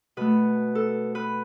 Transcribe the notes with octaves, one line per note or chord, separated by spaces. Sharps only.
B2 A3 B4
A4
B4